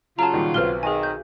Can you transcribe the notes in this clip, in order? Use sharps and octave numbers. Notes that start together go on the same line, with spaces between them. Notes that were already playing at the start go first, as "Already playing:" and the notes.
C#3 F#3 F4 A5 A#5
A#2 D#3 G3
B1 C4 B4 F6 G7
D#3 G#4 G#5
G6